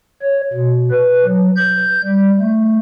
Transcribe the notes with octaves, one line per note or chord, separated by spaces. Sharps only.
C#5
B2
B4
F#3
G6
G3
A3